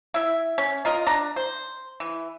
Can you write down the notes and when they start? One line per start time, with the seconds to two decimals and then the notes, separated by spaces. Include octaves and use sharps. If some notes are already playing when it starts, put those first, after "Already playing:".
0.14 E4 E5
0.58 C#4
0.85 F4 A#4 D#5
1.07 D4 A#5
1.36 C5
2.00 E3